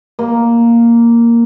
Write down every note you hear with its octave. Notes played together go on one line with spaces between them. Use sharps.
A#3